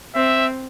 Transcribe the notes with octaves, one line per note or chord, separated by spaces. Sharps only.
C4 E5